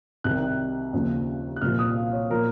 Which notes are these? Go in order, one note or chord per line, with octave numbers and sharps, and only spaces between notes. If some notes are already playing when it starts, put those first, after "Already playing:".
C2 C3 D#3 F#6
D#2 C#3 F3
F#6
C2 A#2 F3 F6
D#6
F5
C#5
A#2 F3 A#4